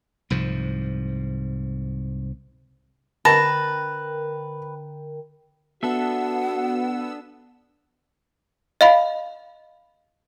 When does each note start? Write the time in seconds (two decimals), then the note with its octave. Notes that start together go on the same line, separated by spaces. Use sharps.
0.30 C2 G#2 F3
3.25 D3 A#4 B4 G5 A5 A#6
5.83 B3 D4 F#4 A4 E5 F#5 E6
8.81 D#5 F5 B5